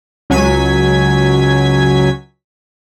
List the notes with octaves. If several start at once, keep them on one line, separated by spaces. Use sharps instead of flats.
C#2 F#3 G#5 G#6 B6